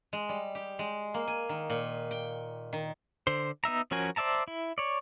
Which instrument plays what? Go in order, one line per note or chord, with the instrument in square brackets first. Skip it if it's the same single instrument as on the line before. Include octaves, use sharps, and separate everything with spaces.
[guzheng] G#3
G3
G4
G#3
A#3
G#5
D#3
A#2
G5
D#3
[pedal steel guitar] D3 C5
B3 D#4 E5 A#5
F3 C#4 F#4 A#4 G#5
C5 D5 E5 A5 A#5
E4
C#5 D5